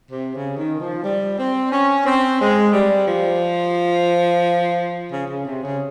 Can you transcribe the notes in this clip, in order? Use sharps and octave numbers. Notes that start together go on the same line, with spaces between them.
C3
C#3
D#3
F3
G3
C4
C#4
C4
G#3
G3
F3
C#3
C#3
C3
C#3